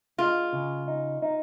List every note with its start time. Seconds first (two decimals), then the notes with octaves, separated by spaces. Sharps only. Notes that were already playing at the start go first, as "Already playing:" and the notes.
0.18 G#3 F4
0.53 C#3
0.88 D#4
1.22 D#4